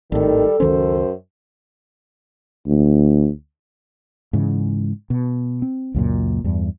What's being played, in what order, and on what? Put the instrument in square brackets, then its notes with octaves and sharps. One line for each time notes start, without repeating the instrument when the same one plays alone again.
[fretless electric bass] G#1 A2 [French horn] D#3 [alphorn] G3 [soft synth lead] A4
[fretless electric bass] C#2 D#3 C#4 [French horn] F#2 [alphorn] C5
[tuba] D2
[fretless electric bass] G#2 C#3 E3
B2
C4
C#2 F#2 A#2
E2 G2